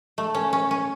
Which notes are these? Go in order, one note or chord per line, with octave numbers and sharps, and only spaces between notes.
A3
C#4
C#4
C#4